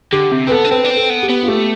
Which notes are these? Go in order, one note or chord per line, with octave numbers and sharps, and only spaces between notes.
D3 G4
C3
C4 B4
B3 A4
D4
C4 B4
D4
C4
A4
B3
G4
B3
F4
A3 G4